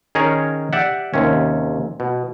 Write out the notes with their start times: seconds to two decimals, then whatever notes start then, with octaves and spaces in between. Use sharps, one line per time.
0.15 D#3 C#4 G#4 A#4 C#5
0.73 G4 D5 E5 F#5
1.14 D#2 C3 C#4
2.00 B2